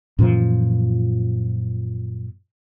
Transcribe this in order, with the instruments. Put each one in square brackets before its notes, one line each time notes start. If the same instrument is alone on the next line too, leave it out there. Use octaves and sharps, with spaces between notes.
[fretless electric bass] F#2 A#2 E3 F3